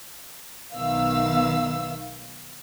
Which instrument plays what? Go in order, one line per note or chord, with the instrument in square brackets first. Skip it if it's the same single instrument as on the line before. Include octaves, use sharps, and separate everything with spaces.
[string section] B1 D#3 B3 E5 F5 E6